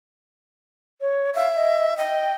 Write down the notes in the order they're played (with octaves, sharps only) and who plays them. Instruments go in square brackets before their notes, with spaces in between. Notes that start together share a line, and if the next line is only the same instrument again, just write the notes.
[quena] C#5
[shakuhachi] E5 [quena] F5
[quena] D#5
[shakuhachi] D#5 [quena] G5